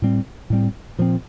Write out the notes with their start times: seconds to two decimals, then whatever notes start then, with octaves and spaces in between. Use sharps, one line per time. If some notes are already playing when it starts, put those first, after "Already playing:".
0.02 A2 G3 C4
0.50 A2 G3 C4
0.98 A#2 F3 C4